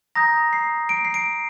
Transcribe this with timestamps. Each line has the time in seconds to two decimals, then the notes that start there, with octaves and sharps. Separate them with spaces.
0.15 A#5 D#6 G6 A#6
0.53 C7
0.89 D7
1.05 C7
1.14 D7